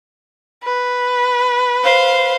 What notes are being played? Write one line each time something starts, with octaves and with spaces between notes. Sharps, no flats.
B4
C5 F5